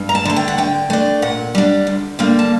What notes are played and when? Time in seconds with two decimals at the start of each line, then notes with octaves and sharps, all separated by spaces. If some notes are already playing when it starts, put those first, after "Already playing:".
Already playing: G2
0.09 A#5
0.15 A5
0.25 D3 A3
0.36 G5
0.48 F#5
0.58 D3 G5
0.90 A3 D4
1.22 A#2 F#5
1.55 G3 D4
1.87 D2
2.19 D3 G3 A#3
2.39 A5